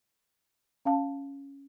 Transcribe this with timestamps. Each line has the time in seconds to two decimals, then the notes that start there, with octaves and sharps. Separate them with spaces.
0.85 C#4 F5 A5